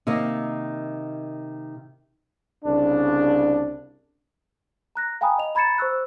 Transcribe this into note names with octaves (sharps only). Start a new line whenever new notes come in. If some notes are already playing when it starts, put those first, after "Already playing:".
C3 D#3 A#3 D#5
C2 C#3 D4
A#5 F#6 A#6
F5 G5 G#5 A#5 B5 D#6
D#5 F7
A#5 B5 G#6 A6 C#7 E7
C5 C#6 E6 F#6